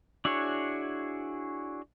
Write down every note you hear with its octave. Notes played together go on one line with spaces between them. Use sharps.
D4 E4 F#4 G#4 C#5